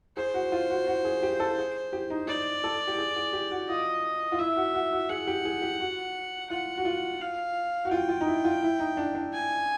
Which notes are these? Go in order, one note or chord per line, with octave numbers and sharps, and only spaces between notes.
G#4 C5
F#4
F4
F#4
F#4
G#4
G4
A4
G#4
G4
D#4
D#4 D5
A4
G4
G#4
G#4
G4
F#4
F4 D#5
F4
E4 E5
F#4
F#4
F#4
G#4 F#5
G4
G#4
G4
F#4
F4 F#5
F#4
F4
F5
F#4
F4 G5
F4
D#4
E4
F4
E4
D#4
D4
D4
G#5